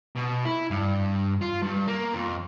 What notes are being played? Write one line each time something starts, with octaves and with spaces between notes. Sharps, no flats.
B2
E4
G2
F4
G2
A#3
F2